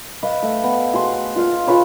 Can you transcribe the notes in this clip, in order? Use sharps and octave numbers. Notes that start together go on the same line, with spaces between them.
B4 D#5 F5
A3
B3
F#4 G#4 C6
F4 F5
F4 G#4 B4 C#5